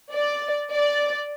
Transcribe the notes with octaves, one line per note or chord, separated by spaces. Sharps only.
D5
D5